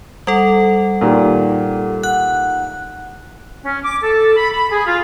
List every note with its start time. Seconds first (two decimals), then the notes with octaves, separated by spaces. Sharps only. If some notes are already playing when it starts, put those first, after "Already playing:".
0.27 G3 A4 F#5
1.01 A#2 D#3 G4
2.03 F#5 F#6
3.63 C#4
3.84 D6
4.03 A4
4.36 B5
4.52 B5
4.70 G#4
4.87 F4